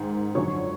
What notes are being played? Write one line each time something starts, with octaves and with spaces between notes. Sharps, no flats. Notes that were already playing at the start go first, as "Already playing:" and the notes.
Already playing: G#2 D#3 G#3
F#2 D3 F3 C#5 C#6